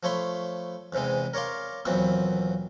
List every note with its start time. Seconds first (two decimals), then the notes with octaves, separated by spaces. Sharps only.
0.03 F3 A3 C#5 B5 C6
0.93 E2 G#2 C3 E3 G#3
1.34 A#4 C#5 D5 F5 C6
1.85 D#2 A#2 E3 F#3 B3 C4